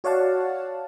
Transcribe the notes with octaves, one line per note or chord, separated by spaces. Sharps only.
F#4 C#5 D5 F5 F#5 A5